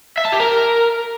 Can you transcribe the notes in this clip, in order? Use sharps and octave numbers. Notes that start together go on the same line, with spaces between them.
E5
A5
G4
A#4